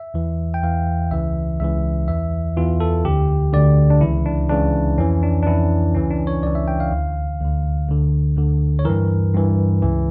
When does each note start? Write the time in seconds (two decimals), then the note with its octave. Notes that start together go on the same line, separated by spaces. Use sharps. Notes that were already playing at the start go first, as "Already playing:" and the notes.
Already playing: E5
0.14 E2 E3
0.54 G5
0.63 E2 E3 F5
1.11 C#2 C#3 E3 E5
1.60 C#2 C#3 E3 E5
2.08 E2 E3 E5
2.57 E2 E3 F4
2.80 A4
3.04 D2 D3 G4
3.53 D2 D3 D5
3.90 D4
4.01 C#2 C#3 E3 E4
4.26 D4
4.49 C#2 C#3 E3 D4
4.98 F2 E3 C#4
5.23 D4
5.43 D4
5.46 F2 E3 E4
5.95 C#2 C#3 E3 C#4
6.11 D4
6.27 C#5
6.43 C#2 C#3 E3 D5
6.55 E5
6.68 G5
6.80 F5
6.92 D2 D3
7.40 D2 D3
7.88 D2 D3
8.37 D2 D3
8.79 C#5
8.85 G2 E3 A#4
9.34 G2 E3
9.82 C#2 C#3 E3